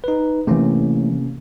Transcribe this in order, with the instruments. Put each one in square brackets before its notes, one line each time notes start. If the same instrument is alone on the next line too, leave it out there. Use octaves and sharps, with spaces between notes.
[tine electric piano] D#4 B4
[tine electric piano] C3 A#3 C#4 [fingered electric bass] E3 A3